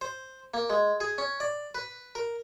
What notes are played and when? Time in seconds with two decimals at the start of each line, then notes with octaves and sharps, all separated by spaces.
0.01 C5
0.54 A#3
0.70 G#3
1.00 G#4
1.18 C#4
1.40 D5
1.75 B4
2.15 A#4